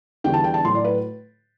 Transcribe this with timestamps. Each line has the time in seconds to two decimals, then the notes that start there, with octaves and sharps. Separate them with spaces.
0.24 E2 D3 G3 G5
0.33 A5
0.44 G5
0.54 A5
0.64 A2 F#3 C6
0.75 D5
0.84 B4